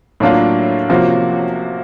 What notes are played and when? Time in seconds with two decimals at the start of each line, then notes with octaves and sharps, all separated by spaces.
0.20 A2 F#3 A#3 D4 F4
0.89 C3 F3 A#3 C#4 F#4